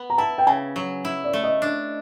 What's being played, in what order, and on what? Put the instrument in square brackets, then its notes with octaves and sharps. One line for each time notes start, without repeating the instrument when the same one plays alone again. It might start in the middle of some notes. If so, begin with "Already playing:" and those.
Already playing: [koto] B3
[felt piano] A#5
[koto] E4 [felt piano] A5
[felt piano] G5
[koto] C#3 [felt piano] G#5
[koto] F#3
E4
[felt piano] D5
[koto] A3
[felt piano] D#5
[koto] D4